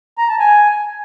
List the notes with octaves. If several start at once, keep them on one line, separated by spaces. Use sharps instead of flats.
A#5
A5
G#5